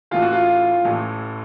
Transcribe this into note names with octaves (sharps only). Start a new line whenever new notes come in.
A1 A2 E3 F4
F#4
F4
A1 A2 E3